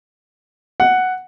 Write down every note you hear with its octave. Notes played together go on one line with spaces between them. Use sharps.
F#5